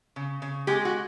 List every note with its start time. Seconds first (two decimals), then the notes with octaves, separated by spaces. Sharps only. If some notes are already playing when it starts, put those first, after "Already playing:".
0.16 C#3
0.42 C#3
0.67 G#3 G4
0.85 F#4